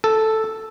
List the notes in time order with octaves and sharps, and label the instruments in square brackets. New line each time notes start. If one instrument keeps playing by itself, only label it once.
[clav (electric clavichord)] A4